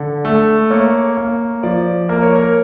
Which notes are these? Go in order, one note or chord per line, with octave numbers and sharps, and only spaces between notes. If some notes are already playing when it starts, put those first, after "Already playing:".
Already playing: D3
A3
A#3 C#5
A#3
F3 D5
A#3 A#4
C#5
A#4